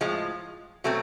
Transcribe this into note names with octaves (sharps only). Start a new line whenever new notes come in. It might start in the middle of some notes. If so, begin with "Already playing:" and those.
A2 F3 G#3
B2 F#3 A3 C4